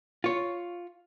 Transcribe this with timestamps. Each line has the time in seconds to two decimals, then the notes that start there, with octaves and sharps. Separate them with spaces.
0.24 F4 C#5